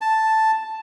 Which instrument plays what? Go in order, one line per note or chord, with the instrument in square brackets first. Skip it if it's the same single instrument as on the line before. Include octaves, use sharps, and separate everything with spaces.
[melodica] A5